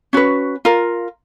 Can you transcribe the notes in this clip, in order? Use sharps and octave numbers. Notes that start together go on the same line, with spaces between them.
C#4 F#4 B4
F4 A#4